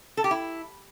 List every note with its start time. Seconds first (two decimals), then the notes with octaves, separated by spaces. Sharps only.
0.17 A4
0.24 G4
0.31 E4